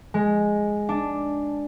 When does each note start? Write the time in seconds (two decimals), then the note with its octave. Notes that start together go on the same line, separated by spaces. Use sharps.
0.14 G#3
0.89 D4